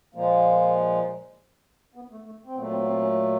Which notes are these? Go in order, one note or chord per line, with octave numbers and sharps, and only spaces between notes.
A#2 F3 G#3 A#3
B3
A3
A3
C4
A#2 F#3 A3 B3
C4
B3
C4
C#4